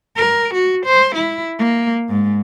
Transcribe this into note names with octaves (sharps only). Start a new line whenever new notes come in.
A#4
F#4
C5
E4
A#3
G#2